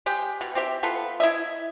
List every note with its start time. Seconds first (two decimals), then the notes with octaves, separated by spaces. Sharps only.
0.06 G#3 G4 G5
0.41 B2
0.55 C4 G4 E5
0.83 B3 F4 A4 B4
1.20 E4 D#5 E5